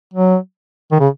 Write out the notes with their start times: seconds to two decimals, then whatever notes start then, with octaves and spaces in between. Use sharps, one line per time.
0.14 F#3
0.92 D#3
1.00 C#3